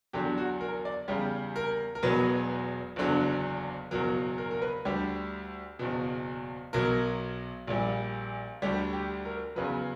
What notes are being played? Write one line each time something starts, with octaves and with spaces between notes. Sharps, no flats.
E2 D3 F#3 G4
F#4
A#4
D5
E2 C#3 G3 G4
A#4
A#4
E1 E2 B2 F#3 B4
F#1 E2 D3 F#3
F#1 E2 B2 F#3 A#4
A#4
A#4
B4
D2 D3 G3 G4
F#1 E2 B2
B1 B2 F#3 A#4
A#1 A#2 G3
D2 D3 G3 G4
G4
A#4
E2 C#3 F#3 B4